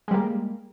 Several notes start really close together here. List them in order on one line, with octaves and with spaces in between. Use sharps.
G#3 G3 A#3